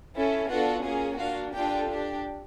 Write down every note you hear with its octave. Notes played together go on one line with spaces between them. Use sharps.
C#4 E4 A4
B3 D4 F4 F#4 A4 F#5
A#3 C#4 F4 G#4
A#3 D4 F4 F#4 F5
D4 F4 G4 A4 G5
D4 G4